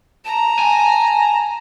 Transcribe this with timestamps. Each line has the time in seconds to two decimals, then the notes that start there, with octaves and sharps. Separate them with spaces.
0.25 A5 A#5
0.59 G#5